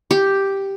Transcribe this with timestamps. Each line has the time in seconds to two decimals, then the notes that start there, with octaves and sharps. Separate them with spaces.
0.11 G4